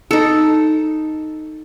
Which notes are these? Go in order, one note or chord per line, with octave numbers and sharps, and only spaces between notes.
D#4 A4